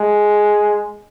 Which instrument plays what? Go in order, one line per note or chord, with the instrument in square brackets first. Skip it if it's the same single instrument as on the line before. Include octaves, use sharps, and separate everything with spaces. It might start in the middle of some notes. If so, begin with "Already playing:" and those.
Already playing: [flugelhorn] G#3